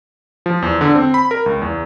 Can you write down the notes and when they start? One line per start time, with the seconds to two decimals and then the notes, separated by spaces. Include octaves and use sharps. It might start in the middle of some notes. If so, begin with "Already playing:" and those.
0.46 F3
0.62 E2
0.81 D3
0.95 C4
1.14 B5
1.31 A#4
1.46 C#2
1.61 E2